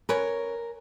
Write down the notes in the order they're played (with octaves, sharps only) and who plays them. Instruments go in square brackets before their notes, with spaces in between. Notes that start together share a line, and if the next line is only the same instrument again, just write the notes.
[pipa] C#4 B4 C#5 [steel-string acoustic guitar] A#4